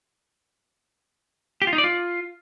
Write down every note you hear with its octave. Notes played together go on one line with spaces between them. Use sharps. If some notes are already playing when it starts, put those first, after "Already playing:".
G4
F4
D#4
D5
F4